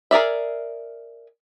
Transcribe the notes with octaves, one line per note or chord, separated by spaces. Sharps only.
G#4 A#4 D5 E5